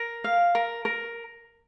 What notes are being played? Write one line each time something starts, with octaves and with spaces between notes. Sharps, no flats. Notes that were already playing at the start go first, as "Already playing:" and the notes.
Already playing: A#4
F5
A#4
A#4